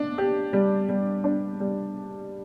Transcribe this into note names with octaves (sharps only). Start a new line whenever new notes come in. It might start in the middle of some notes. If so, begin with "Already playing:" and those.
Already playing: D4
G4
G3
G3
D4
G3